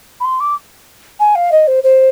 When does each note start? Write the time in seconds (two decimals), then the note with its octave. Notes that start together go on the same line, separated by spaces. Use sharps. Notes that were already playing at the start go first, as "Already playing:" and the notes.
0.20 B5
0.24 C6
0.40 D6
1.20 G#5
1.35 F5
1.52 D#5
1.67 C5
1.84 C5